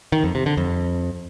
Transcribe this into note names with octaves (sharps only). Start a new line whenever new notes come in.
D#3
F2
C3
D3
F2